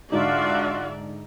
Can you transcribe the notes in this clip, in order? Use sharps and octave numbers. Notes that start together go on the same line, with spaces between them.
G#2 D3 D4 D#4 F4 F#4 D5 E5